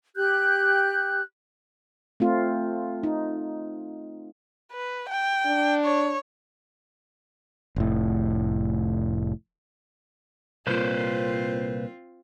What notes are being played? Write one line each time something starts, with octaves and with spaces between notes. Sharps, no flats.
G4 F#6 G6
A3 C4 F4
D#4
B4
G5
D4
C#5
F1 A2
C2 A#2 C4 F4 B4 C5